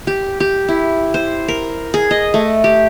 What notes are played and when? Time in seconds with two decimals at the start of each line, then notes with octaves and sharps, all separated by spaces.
0.07 G4
0.40 G4
0.68 E4
1.14 C5
1.48 A#4
1.94 G#4
2.11 D#5
2.34 A3
2.64 G4